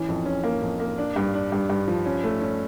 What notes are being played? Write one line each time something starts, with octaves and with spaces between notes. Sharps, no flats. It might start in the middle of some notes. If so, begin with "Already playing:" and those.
Already playing: E3 C#4
F2
C#4
A#3
F2
A#3
D4
G2
D4
G2
G2
F3
C#4
A3
C#4